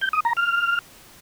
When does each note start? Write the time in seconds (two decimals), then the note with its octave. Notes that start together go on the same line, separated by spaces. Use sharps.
0.01 G6
0.13 D#6
0.25 A#5
0.37 F6